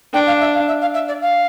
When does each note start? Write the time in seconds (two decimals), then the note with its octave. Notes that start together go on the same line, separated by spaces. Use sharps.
0.13 D4 G5
0.26 F5
0.40 E5
0.54 F5
0.67 E5
0.80 F5
0.93 E5
1.07 D5
1.21 F5